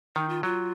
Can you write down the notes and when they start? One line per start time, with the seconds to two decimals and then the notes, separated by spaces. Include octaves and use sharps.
0.16 D#3 D#4
0.29 F4
0.43 F#3 F4